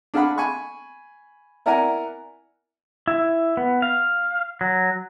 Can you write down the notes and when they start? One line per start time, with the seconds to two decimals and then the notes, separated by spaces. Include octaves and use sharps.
0.14 D4 G#4 F5 F#5 B5
0.38 G#5 B5 C#6
1.66 E4 A#4 D5 F#5 G#5 A#5
3.07 E4
3.57 B3
3.82 F5
4.61 F#3